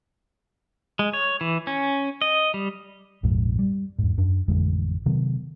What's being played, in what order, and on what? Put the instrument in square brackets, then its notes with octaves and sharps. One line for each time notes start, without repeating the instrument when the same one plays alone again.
[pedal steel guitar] G#3
C#5
E3
C#4
D#5
G3
[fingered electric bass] A#1 F2 G#2
G3
E2 G#2
F#2 D4
A1 F2 D3 G#3
C3 D#3 F#3 B3